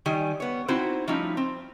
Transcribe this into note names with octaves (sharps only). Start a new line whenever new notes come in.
D#3 G3 G#5
B3 C#5
C4 D#4 E4 F#4 C5
F3 G3 A3 C#4 D#4 E4
C4